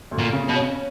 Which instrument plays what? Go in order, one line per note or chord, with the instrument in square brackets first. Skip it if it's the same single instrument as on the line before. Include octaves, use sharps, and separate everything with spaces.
[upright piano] D2
[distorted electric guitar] A#2
[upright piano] C#3
[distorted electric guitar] B2
[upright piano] C#4